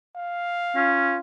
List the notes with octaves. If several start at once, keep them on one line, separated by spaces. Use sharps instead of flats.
F5
C#4 F4